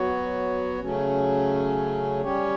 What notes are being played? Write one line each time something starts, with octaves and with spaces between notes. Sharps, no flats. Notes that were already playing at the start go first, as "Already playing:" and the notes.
Already playing: F#3 B3 F#4 C#5
C#3 F#3 A3 C#4
G3 C#4 G4 C#5